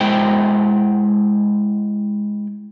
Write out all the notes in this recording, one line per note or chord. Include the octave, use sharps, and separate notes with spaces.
G#3 E4 C5 G5